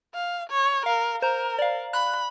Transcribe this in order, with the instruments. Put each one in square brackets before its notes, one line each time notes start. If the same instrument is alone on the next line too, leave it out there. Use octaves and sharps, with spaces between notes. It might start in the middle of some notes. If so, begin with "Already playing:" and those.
[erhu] F5
C#5
[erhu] A#4 [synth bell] F5
[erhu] A#4 [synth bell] C5 A#5
[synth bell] D5 F5
[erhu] B5 [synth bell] F#6